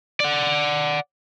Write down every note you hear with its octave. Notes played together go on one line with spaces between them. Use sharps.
D5 F#5